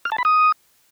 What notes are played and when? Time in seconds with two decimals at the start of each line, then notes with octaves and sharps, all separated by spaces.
0.05 F6
0.12 A5
0.18 B5
0.25 D#6